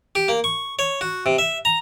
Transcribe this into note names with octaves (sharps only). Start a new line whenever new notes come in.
G4
A#3
C#6
C#5
F#4
C3
E5
A#5